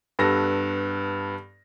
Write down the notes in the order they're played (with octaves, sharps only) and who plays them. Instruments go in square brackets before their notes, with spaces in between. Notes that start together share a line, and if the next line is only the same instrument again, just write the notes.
[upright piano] G2 B3 A4 A#6